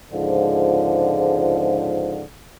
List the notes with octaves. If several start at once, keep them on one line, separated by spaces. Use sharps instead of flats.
C#2 G#2 D3 F3